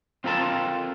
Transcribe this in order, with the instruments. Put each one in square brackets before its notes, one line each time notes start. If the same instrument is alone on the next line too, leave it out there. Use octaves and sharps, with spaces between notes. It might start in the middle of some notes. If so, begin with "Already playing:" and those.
[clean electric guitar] C4 F4 A4 A#4 A5